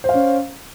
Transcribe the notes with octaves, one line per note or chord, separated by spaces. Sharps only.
C#4 C5 F5